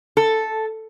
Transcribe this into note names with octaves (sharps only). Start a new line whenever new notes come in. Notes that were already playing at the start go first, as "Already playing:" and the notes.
A4